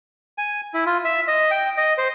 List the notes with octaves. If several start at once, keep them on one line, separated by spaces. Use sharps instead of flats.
G#5
E4
F4
E5
D#5
G5
D#5
C5